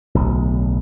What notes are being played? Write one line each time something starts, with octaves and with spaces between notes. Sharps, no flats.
D1 B1